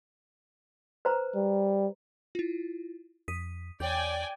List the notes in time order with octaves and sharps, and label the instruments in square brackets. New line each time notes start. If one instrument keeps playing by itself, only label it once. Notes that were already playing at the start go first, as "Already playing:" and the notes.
[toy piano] B4 C5 A#5
[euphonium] G3
[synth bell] E4 F4
[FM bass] F2 [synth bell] D#6 B6 D#7
[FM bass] E2 [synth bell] C#5 G6 [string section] D5 G5 G#5